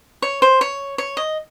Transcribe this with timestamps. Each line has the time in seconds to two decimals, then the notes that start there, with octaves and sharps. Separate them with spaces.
0.22 C#5
0.42 C5
0.61 C#5
0.98 C#5
1.17 D#5